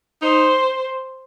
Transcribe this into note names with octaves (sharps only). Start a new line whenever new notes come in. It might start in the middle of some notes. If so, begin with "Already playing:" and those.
D#4 C5